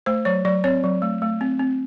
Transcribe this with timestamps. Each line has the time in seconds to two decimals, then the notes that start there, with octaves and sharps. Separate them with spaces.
0.06 A3 C5
0.25 F#3 C#5
0.45 F#3 D5
0.64 C4 C#5
0.84 F#3
1.02 A3
1.22 A3
1.41 C4
1.59 C4